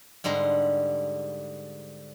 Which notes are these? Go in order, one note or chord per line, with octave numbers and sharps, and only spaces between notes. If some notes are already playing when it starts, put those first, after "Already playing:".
G#2 D3 G3 A#5 C6